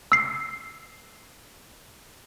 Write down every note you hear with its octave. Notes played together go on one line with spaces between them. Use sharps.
E6 C7